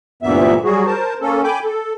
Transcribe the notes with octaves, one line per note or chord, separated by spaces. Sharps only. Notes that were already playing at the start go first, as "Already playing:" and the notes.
D2 G2 A#2 E3 B3 E5
F#3 G3 F#4 G#4
A#4 C5 A5
A#3 C#4 A4
G5 G#5 B5 D6 G6
A4